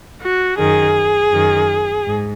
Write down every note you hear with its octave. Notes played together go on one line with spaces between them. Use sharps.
F#4
F#2 D#3 G#4
F#2 D#3
G#2